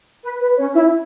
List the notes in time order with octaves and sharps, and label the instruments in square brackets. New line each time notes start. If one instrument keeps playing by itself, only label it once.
[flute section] B4
B4
C#4 C#5
E4 E5